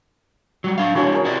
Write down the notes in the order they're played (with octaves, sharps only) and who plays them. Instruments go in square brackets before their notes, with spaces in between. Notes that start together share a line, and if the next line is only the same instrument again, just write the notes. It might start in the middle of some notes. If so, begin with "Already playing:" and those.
[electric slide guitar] F#3 G3
D4 F5
[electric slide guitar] E3 D4 E4 [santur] F#4 C#5 G#5
[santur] G#4 A#4 C#5
[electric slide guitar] E4 C5 D5